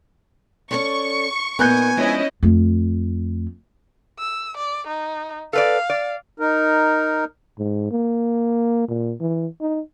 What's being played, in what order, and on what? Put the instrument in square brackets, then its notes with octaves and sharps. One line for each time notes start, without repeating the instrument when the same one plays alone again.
[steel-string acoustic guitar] C#4 A4 D5 [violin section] C#6
[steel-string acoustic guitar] A#2 D#4 A#4 [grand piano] B3 F#6 G6 [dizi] G#5
[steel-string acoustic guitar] F3 G#3 D4 [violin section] C#4 E4 D#5
[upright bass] F2 A3
[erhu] E6
D5
D#4
[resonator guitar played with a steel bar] A4 B4 D5 [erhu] F5
[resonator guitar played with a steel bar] D5
[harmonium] D#4 A#4
[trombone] G#2
A#3
A#2
E3
D#4